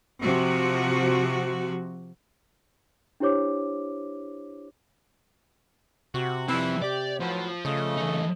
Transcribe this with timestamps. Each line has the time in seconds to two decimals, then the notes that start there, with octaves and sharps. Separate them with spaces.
0.20 C3 F3 F#4
3.20 D4 E4 G4 C5 C#5 D6
6.14 C3 F#4
6.49 E3 F3 G3 C4 E4
6.82 G4 D5
7.20 A2 F3 F#3 B3
7.65 C#3 A3 D#5
7.97 E3 D#4